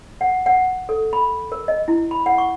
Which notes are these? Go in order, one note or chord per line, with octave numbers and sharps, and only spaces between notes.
F#5
F#5
A4
B5
A#4
D#5
E4
B5
F#5
C#6